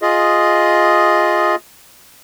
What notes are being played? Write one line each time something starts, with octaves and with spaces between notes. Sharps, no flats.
F4 G#4 D#5